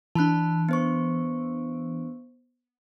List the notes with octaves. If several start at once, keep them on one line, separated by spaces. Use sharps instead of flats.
E3 D4 A5 B5 F#6
B3 C5 C#6